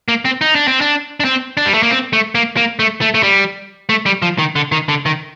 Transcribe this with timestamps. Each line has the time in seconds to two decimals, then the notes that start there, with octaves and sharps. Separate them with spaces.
0.08 A#3
0.25 C4
0.41 D#4
0.55 D4
0.68 C4
0.81 D4
1.20 D4
1.25 C4
1.57 D4
1.66 G3
1.74 A3
1.83 A#3
1.91 C4
2.13 A3
2.35 A#3
2.57 A#3
2.79 A3
3.01 A3
3.14 A3
3.23 G3
3.89 A3
4.06 G3
4.22 F3
4.39 D#3
4.56 D3
4.72 D#3
4.89 D3
5.06 D#3